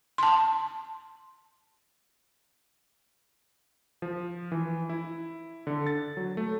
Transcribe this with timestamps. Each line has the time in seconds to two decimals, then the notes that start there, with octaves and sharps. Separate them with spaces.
0.18 A5 C6
4.02 F3
4.52 E3
4.89 E4
5.67 D3
5.87 A6
6.17 F#3
6.37 A3